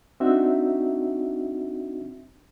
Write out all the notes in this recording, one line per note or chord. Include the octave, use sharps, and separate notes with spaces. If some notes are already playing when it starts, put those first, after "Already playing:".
C4 D4 D#4 F#4 E5